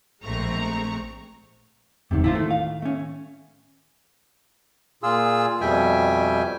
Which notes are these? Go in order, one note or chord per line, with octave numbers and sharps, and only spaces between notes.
A#1 G#3 A3 C4 A#5 C#6
G1 E2 G#2 C3 D#3
A2 D#3 E4 F4 C5
A3
F5
A3 C#4
A#2 F4 G#4 E6
F2 B2 G3 E5 G5 G#5